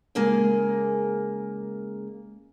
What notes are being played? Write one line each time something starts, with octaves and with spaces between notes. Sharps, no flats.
C#3 G#3 A#3 G#4 A#4 G#5